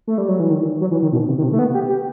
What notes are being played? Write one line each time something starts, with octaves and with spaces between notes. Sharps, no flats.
A3
G3
F#3
E3
D#3
F#3
E3
D#3
B2
C3
D#3
C3
A3
B3
G4
G4